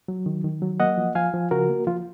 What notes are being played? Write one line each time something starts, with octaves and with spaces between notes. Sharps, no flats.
F#3
D#3
D#3
F#3
A#3 D#5 F#5
F3
F3 F5 G#5
F3
C#3 F#4 A#4
A#3
F3 F4